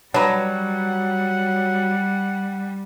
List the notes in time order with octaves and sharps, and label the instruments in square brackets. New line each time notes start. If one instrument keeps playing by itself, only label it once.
[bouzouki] F#3 [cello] G3 [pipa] D4 B4 A#5 [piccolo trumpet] F#5